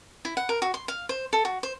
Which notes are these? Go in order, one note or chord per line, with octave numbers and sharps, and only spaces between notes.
E4
F#5
A#4
F#4
C6
F5
C5
A4
F#4
C5